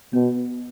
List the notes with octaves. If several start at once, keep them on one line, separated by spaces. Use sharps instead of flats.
B2 B3